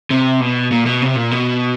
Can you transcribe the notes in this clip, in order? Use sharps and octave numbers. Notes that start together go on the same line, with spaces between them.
C3
B2
A#2
B2
C3
A#2
B2